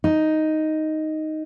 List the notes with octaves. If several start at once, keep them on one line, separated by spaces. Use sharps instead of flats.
D#4